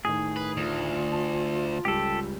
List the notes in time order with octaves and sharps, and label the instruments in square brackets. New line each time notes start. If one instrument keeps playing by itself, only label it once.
[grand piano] A2 D#3 [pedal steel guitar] G#4
[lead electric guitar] B4
[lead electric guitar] D2 [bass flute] F4
[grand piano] A5
[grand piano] C#2 G3 [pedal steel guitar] G4 A4